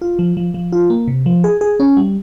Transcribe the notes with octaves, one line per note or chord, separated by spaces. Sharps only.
F4
F3
F3
F3
F4
A#3
C3
F3
G#4
G#4
C#4
G3